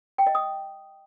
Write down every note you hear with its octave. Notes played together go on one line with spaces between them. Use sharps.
G5
D#5
D#6